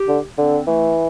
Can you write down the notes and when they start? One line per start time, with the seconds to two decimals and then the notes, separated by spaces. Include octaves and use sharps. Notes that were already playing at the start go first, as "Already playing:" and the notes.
Already playing: G4
0.08 D3
0.38 D3 C4
0.67 E3 A3